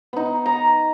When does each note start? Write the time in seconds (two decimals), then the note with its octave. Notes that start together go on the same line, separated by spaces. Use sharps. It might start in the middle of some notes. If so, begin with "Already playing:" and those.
0.13 B3 D#4
0.46 A#5